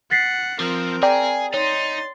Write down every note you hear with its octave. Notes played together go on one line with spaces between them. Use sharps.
F#5 A6 B6 C7
F3 C4 A#4
G#4 D5 G5 A#5
D#4 C#5 C6 A6